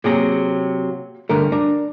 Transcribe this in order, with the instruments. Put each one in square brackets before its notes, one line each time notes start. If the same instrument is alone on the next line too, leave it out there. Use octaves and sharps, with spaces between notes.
[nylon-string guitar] C3 F#3 [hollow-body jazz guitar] A#3 G#4 A#5
[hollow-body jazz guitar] G2 D3 A3 [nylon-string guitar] A#4
[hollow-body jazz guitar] D4 A#5